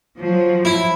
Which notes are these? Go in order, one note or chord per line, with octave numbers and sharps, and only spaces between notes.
F3 F#3
E4